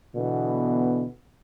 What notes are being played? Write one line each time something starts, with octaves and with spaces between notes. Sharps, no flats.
B2 D3 E3 B3